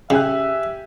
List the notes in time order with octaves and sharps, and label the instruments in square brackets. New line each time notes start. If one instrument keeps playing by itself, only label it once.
[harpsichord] C#3 [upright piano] G4 G#5 F#6 [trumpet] E5